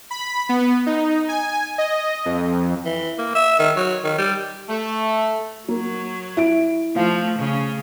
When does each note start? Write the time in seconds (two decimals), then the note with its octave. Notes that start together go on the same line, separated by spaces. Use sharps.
0.11 B5
0.49 B3
0.86 D#4
1.29 G#5
1.78 D#5
2.26 F2
2.85 E3
3.18 A#3
3.35 E5
3.59 D#3
3.76 F#3
4.04 D#3
4.19 G3
4.69 A3
5.69 F#3 A#3
6.37 E4 D7
6.96 F3 A3 F5
7.38 C#3 C#4